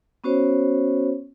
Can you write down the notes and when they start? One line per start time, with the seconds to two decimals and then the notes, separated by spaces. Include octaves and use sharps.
0.24 B3 C#4 F#4 C5 C#5